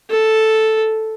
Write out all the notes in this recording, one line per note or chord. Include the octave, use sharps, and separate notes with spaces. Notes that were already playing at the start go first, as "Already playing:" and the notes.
A4